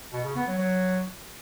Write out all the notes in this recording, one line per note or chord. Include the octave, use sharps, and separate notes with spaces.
B2
C#3
B3
F#3
F#3